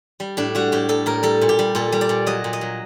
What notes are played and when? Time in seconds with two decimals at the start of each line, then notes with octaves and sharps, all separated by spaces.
0.20 G3
0.37 A2 D4
0.55 G3 F#4
0.72 A2 G4
0.89 G3 A4
1.06 A2 A#4
1.23 G3 A4
1.41 A#2
1.49 G4
1.59 G3
1.75 A#2 A4
1.92 G3
2.01 D5
2.09 A#2
2.26 F#3 D#5
2.44 A#2
2.53 D#5
2.61 F#3